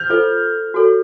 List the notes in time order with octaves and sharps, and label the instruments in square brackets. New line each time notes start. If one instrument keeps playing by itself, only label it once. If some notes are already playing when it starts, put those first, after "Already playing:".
Already playing: [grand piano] F6 G6
[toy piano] F4 A4 C5 D#5
F#4 A4 C#5